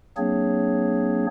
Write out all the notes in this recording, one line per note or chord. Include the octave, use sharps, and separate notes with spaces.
F#3 A#3 C4 D4 G#4 C#5